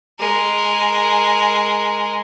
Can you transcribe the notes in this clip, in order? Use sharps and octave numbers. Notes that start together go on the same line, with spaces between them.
G#3 A#4